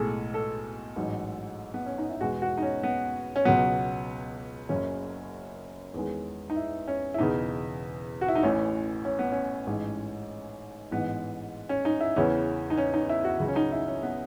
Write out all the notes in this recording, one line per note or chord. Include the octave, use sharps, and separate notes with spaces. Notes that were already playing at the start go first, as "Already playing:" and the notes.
Already playing: B1 A2 G#3 G#4 A4
A4
A1 G#2 F#3
B3
C#4
D#4
E4
E2 B2 G#3 F#4
F#4
D#4
C#4
B3
C#4
C#2 B2 F#3 B3
F#1 F#2 C#3 C#4
E2 D#3 G#3
D#4
E4
C#4
E4
E1 E2 C#3 D#4
F#4
E4
D#4
A1 A2 E3 C#4
C#4
B3
C#4
A1 G#2 E3 G#3
A1 G#2 E3 B3
C#4
D#4
E4
E2 C#3 E3 C#4
D#4
C#4
D#4
E4
F#4
C#2 C#3 F#3
C#4
D#4
E4
C#4
B3